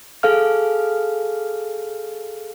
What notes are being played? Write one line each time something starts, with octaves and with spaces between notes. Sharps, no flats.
G#4 A4 F5 F6